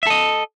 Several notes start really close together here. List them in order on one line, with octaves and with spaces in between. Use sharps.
E5 A4 D#5